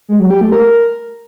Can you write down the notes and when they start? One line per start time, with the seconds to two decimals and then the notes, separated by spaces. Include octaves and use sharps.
0.09 G#3
0.19 F#3
0.30 G4
0.41 A3
0.52 A#4